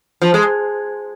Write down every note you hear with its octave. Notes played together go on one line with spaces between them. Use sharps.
F3
G#3